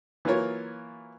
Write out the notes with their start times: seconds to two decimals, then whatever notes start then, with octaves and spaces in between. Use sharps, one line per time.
0.25 E3 F#3 A#3 F4 A#4 C#5